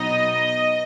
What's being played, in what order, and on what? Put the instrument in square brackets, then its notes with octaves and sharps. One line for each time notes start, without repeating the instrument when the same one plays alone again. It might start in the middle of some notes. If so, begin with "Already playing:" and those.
Already playing: [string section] B2 F#3 B3 D#4 D#5